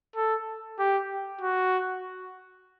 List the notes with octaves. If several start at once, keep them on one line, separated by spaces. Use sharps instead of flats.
A4
G4
F#4